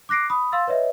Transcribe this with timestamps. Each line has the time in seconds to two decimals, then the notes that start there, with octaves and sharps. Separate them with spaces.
0.09 D6 F#6 A#6 C7 D7
0.30 B5 D#6
0.52 F5 C6 E6 A6
0.67 B4 C#5 D#5 E5